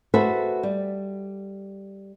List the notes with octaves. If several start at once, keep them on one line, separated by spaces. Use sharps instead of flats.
F#4 G#4 A4 B4 C5 E5
G3